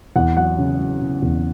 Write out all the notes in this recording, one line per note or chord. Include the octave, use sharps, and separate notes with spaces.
E2 F#5
F#3 F#5
C#3
F#3
C#3
E2